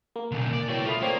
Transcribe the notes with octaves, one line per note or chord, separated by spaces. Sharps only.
A#3
B1 D3
D5
C2 B2 E4 C#5
A3 F4 B5 D#6
A#3 C4 C#5 D5